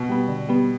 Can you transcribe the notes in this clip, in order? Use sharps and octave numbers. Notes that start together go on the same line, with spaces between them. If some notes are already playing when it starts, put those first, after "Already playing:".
Already playing: B2
G3 B3
D3
G3 B3